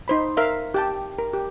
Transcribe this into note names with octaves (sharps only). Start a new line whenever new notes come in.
D#4 C5 B5
A#4 E5 F5
G4 G5 A5
A#4
G4